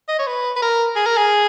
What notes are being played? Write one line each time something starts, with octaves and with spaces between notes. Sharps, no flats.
D#5
C#5
B4
B4
A#4
G#4
A#4
G#4